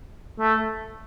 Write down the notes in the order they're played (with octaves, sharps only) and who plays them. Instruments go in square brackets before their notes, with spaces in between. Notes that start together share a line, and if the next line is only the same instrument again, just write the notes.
[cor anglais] A3